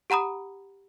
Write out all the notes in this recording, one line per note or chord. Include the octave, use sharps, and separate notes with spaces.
G4 F#5 A#5 B5 D#6